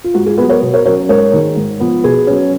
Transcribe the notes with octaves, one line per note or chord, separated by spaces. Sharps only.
F4
G#2 F#4
F4 G#4
F#3 B3 G#4 B4
A#4 C#5
B2
A#4 C#5
F#3 C#4 A#4 C#5
G#2 A#4 C#5
D#3 G#3
G#2
F3 B3
B2 G#4 B4
F#3 C#4